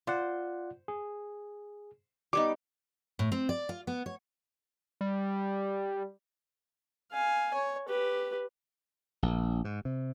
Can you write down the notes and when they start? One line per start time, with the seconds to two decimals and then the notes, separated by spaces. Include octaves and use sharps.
0.07 F4 C5 D5 F#5
0.88 G#4
2.33 G3 B3 D#4 D6
3.19 A2
3.32 C4
3.49 D5
3.69 F4
3.87 B3
4.06 C#5
5.01 G3
7.13 F5 G#5
7.54 C#5
7.88 G4 B4
9.23 A#1
9.65 G#2
9.85 C3